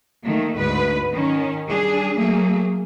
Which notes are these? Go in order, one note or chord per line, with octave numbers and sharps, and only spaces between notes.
D#3 A3 A#3
D2 G#2 B4
D#3 C#4
G3 D4 G#4
F#3 A3 A#3 G#4